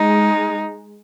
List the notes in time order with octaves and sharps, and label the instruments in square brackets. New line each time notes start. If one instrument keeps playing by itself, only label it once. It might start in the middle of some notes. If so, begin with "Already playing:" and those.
Already playing: [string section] G#3 [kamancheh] D#4